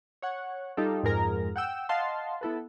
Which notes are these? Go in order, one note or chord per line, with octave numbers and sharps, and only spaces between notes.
C#5 F#5
G3 D#4 F4 G4 A4
F2 G#2 G#4 A#4 A#5
F#5 G5 E6
D#5 F5 F#5 A5 C6
B3 E4 A4 B4